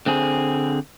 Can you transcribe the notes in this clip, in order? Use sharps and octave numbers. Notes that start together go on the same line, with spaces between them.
D3 C4 G#4